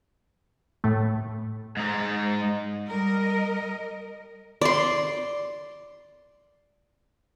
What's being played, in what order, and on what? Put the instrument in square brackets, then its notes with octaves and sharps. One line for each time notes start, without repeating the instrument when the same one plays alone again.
[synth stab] A2 A3
[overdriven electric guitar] G#2 D#4
[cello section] G3 A#4 D#5
[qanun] D5 C6